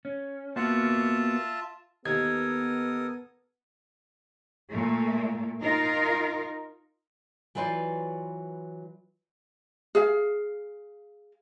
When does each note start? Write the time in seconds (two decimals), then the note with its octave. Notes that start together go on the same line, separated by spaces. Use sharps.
0.05 C#4
0.56 A#3 B3 F4 F#4 E5 A5
2.06 D#2 B3 A4 A#4 D#6 G#6
4.69 A#2 A3
5.61 D#4 F4 A#4
7.55 E3 F#3 F4 B4 C5 D5
9.95 G#4 F5